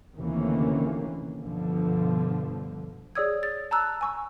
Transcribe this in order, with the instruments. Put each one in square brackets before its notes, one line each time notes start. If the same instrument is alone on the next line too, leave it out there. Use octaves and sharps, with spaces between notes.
[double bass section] D2 C3 D#3 E3 A#3 C#4
G2 B2 D3 F3
[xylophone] G#4 C#5 D5 D#6 E6 G#6
A6
A5 A#5 E6 F#6
G#5 C#6 E6